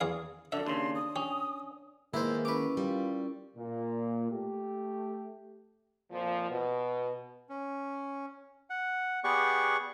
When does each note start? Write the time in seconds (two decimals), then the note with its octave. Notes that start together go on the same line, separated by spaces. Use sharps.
0.01 E2 G#4 F5
0.52 F#2 D3 D4 A4 E5
0.66 D#2 C#3 C6
0.95 D#6
1.16 C#4 G4
2.14 D#3 G#3 A#3 B3 E4 C5
2.45 C#4 E4 A#4 B4 D6
2.77 G3 F4
3.57 A#2
4.31 A3 G4
6.12 F2 A#2 F3
6.51 B2
7.49 C#4
8.70 F#5
9.24 B3 G4 G#4 D5 F#5 C#6